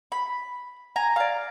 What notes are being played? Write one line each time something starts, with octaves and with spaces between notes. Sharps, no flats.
B5
G#5 A#5
D5 F5